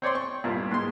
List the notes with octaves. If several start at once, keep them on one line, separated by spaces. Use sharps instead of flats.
C4 C#5 D5 C6
C#6
C2 G2 A#2
G#2 G#3 C6